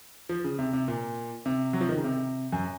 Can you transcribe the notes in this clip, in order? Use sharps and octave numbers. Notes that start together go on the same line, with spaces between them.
F3
C#3
C3
C3
A#2
C3
F#3
F3
D#3
C#3
C3
F#2